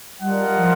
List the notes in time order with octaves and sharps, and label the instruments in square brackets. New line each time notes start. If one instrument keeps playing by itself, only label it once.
[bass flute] G3 [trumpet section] D4 F4 A#4 D#5 F#5
[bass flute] F3